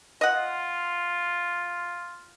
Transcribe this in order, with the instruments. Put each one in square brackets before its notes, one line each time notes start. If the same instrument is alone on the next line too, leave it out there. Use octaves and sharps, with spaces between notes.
[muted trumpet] F4 [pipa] D#5 F#5